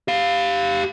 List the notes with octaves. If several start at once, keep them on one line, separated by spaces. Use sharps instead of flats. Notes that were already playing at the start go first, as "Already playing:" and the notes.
G4 F5